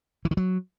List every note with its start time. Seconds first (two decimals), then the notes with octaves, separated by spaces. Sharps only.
0.25 E3
0.31 D#3
0.37 F#3